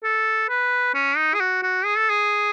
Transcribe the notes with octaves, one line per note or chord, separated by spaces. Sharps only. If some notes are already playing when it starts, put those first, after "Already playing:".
A4
B4
C#4
D#4
G#4
F#4
F#4
G#4
A4
G#4